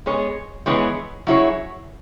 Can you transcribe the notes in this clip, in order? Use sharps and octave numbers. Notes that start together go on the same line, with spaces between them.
G#3 B3 G#4 C#5
E3 G#3 B3 G#4 C#5
F#3 E4 G#4 C#5